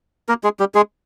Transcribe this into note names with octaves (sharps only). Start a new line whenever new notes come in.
A#3 A#4
G#3 G#4
G3 G4
G#3 G#4